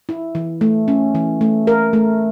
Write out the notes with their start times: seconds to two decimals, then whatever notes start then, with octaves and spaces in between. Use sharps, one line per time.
0.09 E4
0.35 E3
0.61 A3
0.88 C#4
1.15 E3
1.41 A3
1.67 A#4
1.93 A3